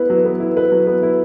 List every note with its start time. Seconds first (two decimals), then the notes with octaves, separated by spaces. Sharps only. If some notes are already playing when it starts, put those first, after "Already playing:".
Already playing: B3 E4 B4
0.10 F#3
0.25 B3
0.40 E4
0.57 B4
0.72 F#3
0.87 B3
1.03 E4